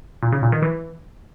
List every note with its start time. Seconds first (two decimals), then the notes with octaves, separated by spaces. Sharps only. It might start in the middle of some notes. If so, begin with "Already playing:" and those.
0.23 A#2
0.33 C#3
0.42 A#2
0.52 D#3
0.62 E3